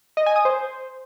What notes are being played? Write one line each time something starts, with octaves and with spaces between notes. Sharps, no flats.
D#5
G#5
D#6
C5